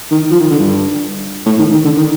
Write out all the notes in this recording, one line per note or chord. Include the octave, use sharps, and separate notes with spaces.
D#3
F3
D#3
D3
G2
A2
D#3
D#3
D3
D#3